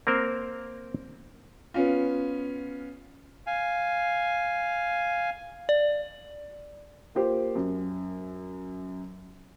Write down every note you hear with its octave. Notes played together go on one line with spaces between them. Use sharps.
A#3 C4 A#4 C5
B3 C#4 F4
F5 G#5
D5
A#3 F4 G4 C5
F#2